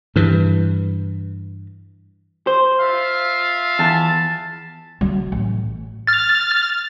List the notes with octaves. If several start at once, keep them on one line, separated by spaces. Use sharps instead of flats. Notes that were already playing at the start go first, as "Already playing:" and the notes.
G2 E3
C5
F4 E5 F5
E2 A5
F#3
A1
F6 A6